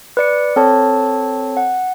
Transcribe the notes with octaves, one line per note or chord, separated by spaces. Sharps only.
B4 D5 C#7
C4 A4 C#5 A5
F#5